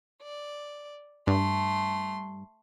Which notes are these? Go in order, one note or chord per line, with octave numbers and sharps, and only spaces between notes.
D5
G2 A3 C6